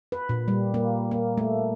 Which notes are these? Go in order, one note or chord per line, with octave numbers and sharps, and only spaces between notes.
B4
A#2
G3
A#3
A#3
A3